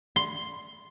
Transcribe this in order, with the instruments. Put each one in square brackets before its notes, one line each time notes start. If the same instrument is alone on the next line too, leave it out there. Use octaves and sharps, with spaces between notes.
[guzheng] C6